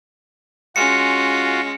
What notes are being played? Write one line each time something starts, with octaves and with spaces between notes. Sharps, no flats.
G#3 C#4 F4 F#4 C#7